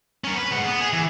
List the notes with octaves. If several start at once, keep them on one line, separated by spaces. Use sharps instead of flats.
C#4 A#4
B4
G#3 F#5
B3
G#4
E3